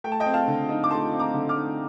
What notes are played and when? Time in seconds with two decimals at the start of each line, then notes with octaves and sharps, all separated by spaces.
0.04 A3 G5
0.12 A5
0.20 D#5 G5
0.26 C4
0.34 F5 A5
0.48 D3
0.69 D#4
0.84 D6
0.91 A3 A5 C6
1.12 C4
1.20 A#5 D6
1.34 D3
1.49 D6 F6
1.56 D#4